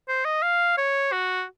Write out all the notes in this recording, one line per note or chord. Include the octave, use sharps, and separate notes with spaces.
C5
D#5
F5
C#5
F#4